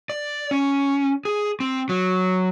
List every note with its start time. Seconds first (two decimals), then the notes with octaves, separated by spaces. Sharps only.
0.10 D5
0.51 C#4
1.25 G#4
1.60 C4
1.89 F#3